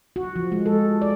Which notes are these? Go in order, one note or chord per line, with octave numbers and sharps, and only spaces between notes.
F#4
F3
G#3
A4
D5